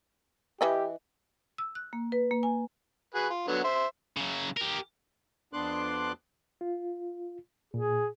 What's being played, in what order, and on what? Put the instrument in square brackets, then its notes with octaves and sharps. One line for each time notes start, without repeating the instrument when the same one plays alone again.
[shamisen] E3 B4 D#5 [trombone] G4
[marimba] E6
F#6
A#3
B4
A#3
G#5
[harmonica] F#4 G#4 B4
F4
D3 F#3 B3
C5 E5
[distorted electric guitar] C#3 F#3
G4 A#4
[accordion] F2 B3 D4 C6 D6 F#6
[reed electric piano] F4
[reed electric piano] A#2 [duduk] G#4